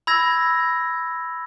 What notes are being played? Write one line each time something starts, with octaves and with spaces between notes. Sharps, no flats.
B5 E6 G#6 A#6